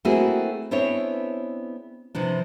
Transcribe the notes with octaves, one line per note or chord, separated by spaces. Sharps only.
A3 A#3 C4 E4 F#4 G#4
B3 C4 D4 E4 G#4 C#5
C3 E3 F3 D4